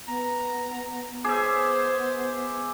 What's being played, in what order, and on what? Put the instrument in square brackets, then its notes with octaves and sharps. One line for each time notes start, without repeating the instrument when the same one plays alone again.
[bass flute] B3 [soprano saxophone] A#5
[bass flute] B3 [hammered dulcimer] G#4 E5 [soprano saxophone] C5 [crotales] D6 G6